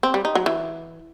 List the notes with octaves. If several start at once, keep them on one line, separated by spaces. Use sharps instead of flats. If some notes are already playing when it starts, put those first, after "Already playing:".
C4
G3
D#4
F#3
E3